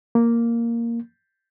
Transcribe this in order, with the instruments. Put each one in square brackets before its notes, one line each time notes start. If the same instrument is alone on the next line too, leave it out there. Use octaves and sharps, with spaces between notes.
[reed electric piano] A#3